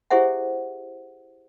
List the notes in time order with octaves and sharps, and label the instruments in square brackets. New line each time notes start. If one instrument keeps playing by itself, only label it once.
[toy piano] E4 G4 G#4 C5 E5 F#5